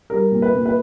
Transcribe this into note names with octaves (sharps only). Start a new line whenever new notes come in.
G3 A#4
A#2
B4
A#2
B4